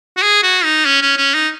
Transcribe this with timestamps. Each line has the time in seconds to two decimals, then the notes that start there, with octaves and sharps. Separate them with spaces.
0.17 F#4
0.22 G#4
0.43 F#4
0.64 D#4
0.85 C#4
1.02 C#4
1.17 C#4
1.34 D#4